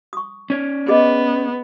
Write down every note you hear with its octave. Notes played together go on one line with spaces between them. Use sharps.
C#6 D#6
C#4 C#5 D5
B3 G#4 D#5